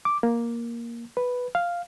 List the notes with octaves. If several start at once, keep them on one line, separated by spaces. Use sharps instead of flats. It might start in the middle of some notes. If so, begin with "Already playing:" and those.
D6
A#3
B4
F5